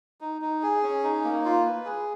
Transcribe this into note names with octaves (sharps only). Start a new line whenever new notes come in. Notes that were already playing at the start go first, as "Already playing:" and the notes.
D#4
D#4
G#4
C#4
D#4
A#3
F4
B4
G#4